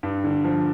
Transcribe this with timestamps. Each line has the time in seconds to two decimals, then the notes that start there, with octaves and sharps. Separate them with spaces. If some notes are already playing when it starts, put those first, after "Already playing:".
0.03 G2
0.24 D3
0.44 F3